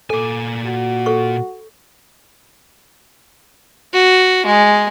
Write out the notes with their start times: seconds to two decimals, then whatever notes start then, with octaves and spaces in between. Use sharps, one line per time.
0.10 A#2 A4 G#5 D6
0.65 F#4
1.06 A4 C#6
3.93 F#4
4.46 G#3